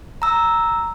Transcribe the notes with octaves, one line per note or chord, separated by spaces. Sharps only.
A#5 E6